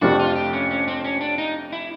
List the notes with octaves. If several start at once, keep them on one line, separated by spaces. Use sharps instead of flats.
F2 C3 F3 A3 D4 F#4
F4
G4
C#4
C#4
C4
C#4
D4
D#4
E4